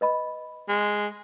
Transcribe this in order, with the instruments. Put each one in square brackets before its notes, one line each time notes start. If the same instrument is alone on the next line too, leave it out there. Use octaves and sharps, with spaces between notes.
[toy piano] B4 D#5 B5
[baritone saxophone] G#3